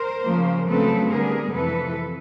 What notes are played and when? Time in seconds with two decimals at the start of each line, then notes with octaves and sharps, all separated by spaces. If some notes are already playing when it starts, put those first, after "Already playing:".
Already playing: A#4 C5
0.25 C#3 F3 A#3
0.67 C#3 F#3 A3 C4 A4 B4
1.09 D3 G3 B3 G#4 A#4
1.52 F2 C3 E3 A4 B4